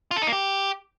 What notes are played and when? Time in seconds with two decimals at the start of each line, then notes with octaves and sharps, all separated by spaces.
0.11 F4
0.16 A4
0.22 D#4
0.27 A#3
0.33 G4